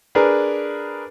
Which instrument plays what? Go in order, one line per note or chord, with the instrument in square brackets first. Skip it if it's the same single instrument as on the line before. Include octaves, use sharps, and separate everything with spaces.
[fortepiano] D4 G#4 A#4 B4